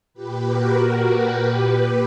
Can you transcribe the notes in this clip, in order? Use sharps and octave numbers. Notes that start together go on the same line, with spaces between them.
A#2 G4 B4
F#4 A#4
A#2
G4 B4
A#2
G4 B4